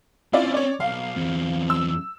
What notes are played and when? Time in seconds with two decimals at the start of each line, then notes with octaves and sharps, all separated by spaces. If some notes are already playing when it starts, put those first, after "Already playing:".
0.33 C4 C#4 E4 F4 D5
0.54 C#5 D5
0.80 B1 F5
1.16 E2 C4
1.70 E6